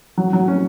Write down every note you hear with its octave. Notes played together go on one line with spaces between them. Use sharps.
F#3
F#3
C#4